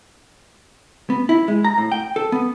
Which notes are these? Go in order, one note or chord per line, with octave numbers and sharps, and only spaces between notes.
B3
E4
G#3
A#5
A2
G5
A4
B3